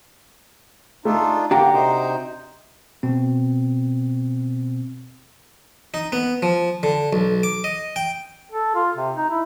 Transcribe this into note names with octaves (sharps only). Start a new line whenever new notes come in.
A3 D4 D#4 F4 A4
D3 A#3 D4 F#4 G4 G5 A#5
C3 D#4 C5
B2 C4
D#4
B3
F3
D3
B1
D6
D#5
G5
A4
F4
C3
D#4
E4